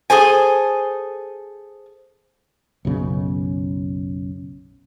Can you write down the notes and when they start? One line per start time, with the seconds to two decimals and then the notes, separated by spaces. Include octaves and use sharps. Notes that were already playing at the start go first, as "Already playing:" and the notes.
0.10 G#4 A4 C5 G#5
2.85 B1 F#2 C#3 B3